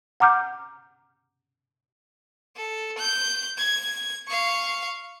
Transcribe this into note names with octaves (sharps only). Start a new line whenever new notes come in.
F#5 A#5 D6 F6 G6
A4
G6
G#6
F5 C#6